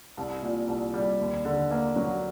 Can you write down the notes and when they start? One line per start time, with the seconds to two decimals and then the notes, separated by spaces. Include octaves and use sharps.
0.17 C2
0.42 A#2
0.68 C2
0.94 G3
1.20 D#2
1.45 D3
1.71 A#3
1.96 F#3